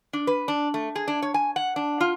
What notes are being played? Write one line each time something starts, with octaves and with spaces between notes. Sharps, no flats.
D4
B4
D4
A3
G#4
D4
C#5
G#5
F#5
D4
F4